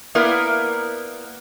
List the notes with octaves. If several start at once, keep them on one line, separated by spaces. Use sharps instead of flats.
A#3 B3 E4 A#4 D5